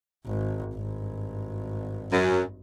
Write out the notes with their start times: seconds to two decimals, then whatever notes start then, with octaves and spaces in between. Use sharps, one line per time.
0.26 G#1
0.75 G#1 G2
2.11 F#2